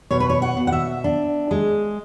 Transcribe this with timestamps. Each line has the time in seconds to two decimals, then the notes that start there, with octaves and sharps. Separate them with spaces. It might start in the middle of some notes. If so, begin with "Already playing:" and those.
0.11 B2 C#5
0.20 B4
0.30 C#5
0.42 F#5
0.57 B2
0.67 F#5
0.72 E5
1.04 D4
1.51 G#3